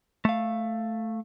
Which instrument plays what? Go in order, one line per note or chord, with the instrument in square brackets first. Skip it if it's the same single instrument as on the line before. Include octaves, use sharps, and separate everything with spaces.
[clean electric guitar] A3 F5